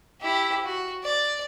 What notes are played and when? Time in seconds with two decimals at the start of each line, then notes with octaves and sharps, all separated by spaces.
0.21 E4 G4
0.64 F#4
1.03 D5